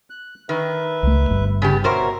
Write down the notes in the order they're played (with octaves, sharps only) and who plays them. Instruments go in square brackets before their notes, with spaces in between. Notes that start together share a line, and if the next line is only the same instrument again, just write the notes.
[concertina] F#6
[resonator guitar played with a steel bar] D#3 [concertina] B4 E5
[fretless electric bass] C#2 A3
G1 G2
[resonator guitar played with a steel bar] C#3 B3 G4 [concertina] A5
[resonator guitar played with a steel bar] B2 A#4 C5 [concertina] F#4 C#5 E5